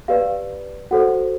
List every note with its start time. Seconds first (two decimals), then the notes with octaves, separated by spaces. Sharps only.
0.08 G4 B4 D5 F5
0.91 F#4 A4 C5 F#5